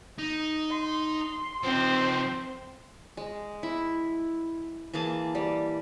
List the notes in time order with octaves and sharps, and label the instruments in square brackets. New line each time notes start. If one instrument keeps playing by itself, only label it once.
[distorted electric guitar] D#4
[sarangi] C6
[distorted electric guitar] F3 D#4 [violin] C4
[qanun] G#3
E4
E3 A#3 G#4 A5
G3